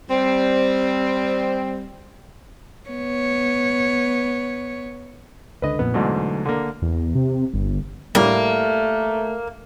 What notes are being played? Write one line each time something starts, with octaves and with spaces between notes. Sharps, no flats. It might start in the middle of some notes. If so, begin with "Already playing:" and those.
G3 C4
B3 C#5
C#2 D3 B4 D#5
A#1 F2 A#2 B3
E2 G#2 B2 D3 F#3 A3
D3 A#3
E2
C3
G1
A2 G3 A3 A#3